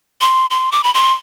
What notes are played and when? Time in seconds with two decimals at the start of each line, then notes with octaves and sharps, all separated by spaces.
0.21 C6
0.50 C6
0.72 D6
0.84 B5
0.94 C6